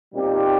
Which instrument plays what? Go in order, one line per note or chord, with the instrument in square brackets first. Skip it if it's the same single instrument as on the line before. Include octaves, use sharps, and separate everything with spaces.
[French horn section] A#2 G3 C4 D#4 G4